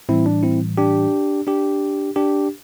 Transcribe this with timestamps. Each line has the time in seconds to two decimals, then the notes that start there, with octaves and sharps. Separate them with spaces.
0.09 A2 E3 G3 C4 E4
0.26 D4
0.43 C4 E4
0.78 D4 G4
1.47 D4 G4
2.16 D4 G4